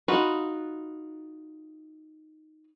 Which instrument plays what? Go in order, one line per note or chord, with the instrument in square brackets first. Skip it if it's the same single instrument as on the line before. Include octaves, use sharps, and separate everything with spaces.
[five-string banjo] D#4 F4 F#4 B4